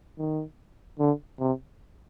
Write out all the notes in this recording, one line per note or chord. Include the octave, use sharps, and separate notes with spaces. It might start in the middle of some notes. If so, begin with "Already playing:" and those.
D#3
D3
C3